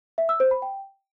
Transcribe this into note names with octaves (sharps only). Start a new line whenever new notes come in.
E5
E6
C5
B5
G5